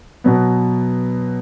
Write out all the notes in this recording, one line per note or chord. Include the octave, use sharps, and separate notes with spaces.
B2 F#3 B3